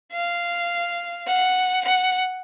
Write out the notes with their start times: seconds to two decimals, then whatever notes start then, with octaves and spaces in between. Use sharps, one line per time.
0.13 F5
1.27 F#5
1.85 F#5